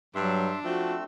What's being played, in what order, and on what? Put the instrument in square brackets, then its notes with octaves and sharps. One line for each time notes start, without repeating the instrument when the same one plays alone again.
[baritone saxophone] G2 [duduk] F#3 [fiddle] D4 [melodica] E5 C6
[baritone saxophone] F3 [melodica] A3 C4 E6 [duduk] F#4